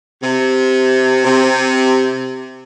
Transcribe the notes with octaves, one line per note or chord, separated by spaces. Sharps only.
C3
C3